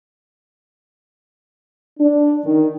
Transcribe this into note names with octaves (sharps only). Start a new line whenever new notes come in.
D4
D#3